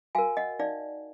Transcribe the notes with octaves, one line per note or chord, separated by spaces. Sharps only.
F#4 A#4 F5 G#5
D#5 F#5
D#4 D5 F5